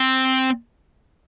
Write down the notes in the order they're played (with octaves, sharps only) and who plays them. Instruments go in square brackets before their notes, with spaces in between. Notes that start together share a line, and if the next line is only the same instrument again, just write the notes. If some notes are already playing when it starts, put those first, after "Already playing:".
Already playing: [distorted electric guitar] C4